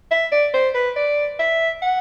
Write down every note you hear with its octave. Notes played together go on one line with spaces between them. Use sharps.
E5
D5
C5
B4
D5
E5
F#5